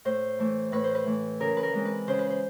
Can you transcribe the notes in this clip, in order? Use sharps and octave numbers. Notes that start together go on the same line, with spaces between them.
A2 C5
E3 A3
A2 B4
C5
B4
E3 A3
C#3 A#4
B4
A#4
E3 G#3 C4
B4
C#3 C5
B4
C5